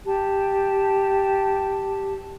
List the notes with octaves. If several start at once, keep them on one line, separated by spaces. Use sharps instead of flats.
G4 A5